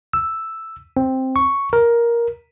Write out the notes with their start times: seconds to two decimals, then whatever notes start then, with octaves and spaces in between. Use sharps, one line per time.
0.13 E6
0.97 C4
1.36 C#6
1.73 A#4